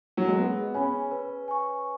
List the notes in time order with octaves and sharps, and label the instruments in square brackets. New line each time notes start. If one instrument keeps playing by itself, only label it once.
[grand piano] F#3
G#3
[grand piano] B3 [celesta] G#4
[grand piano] C#4 [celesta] C#5 G#5 B5
[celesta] B4
G#5 C#6